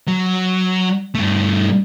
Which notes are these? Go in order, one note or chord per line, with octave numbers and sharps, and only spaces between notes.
F#3
G2 A3